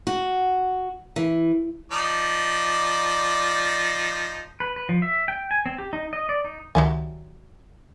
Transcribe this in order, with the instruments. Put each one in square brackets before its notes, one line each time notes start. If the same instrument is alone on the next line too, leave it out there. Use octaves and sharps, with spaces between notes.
[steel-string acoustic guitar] F#4
E3
[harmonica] F3 D#4 D5
[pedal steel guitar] B4
B4
F3
E5
G5
G#5
C4
G4
D#4
D#5
D5
D#4
[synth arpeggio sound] C#2 D#3 E5 [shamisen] F#3 G3 G#5